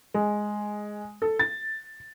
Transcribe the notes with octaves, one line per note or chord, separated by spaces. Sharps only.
G#3
A4
A6